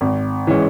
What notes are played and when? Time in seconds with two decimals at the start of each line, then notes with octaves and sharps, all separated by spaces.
0.01 G#1
0.47 E3 G#3 C#4